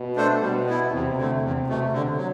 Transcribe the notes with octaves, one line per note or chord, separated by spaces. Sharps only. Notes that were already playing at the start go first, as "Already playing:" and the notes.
Already playing: B2
A3 D4 A4 C5
B2 G3
B3 E4
E2 C3
D3 A3
E2
B2 A3
D3
F#3